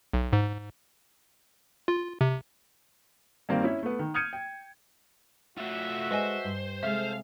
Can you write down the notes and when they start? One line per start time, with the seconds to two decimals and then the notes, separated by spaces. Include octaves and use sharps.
0.14 B1
0.33 G#2
1.88 F4
2.21 C3
3.49 G2 D#3 A#3 C4
3.63 C#4 E4 E5
3.83 A3 B3
3.99 D#3
4.14 D#6 F6 G6 G#6 C#7 D#7
4.33 G5
5.57 A3 F4 F#4 E5
6.11 G#3 A4 B4 C5 D5 D#5 G#5
6.44 G2
6.83 C3 G#3 A4 E5 F5